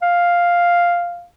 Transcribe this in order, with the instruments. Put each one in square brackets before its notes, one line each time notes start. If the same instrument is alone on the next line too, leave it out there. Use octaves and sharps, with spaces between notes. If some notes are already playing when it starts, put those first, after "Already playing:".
[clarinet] F5